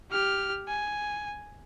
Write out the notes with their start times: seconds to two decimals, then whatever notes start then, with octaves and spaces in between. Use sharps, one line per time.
0.11 G4 F6
0.68 G#5